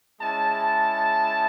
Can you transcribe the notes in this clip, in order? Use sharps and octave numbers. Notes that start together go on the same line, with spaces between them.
G#3 C#4 E4 A5